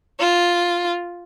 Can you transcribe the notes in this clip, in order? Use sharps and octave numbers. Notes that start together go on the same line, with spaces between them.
F4